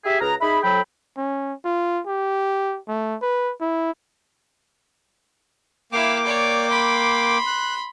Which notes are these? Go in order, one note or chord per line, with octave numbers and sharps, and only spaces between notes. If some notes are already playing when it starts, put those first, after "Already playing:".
G4 G#4 E5
C#2 G#4 B4 A#5
D#4 G#4 E5 B5
F2 F#3 A4 G5 B5
C#4
F4
G4
A3
B4
E4
A#3 E4 F5 G5 D6
C#5 D5
B5 C6
F#6